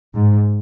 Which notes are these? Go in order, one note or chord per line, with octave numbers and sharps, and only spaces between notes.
G#2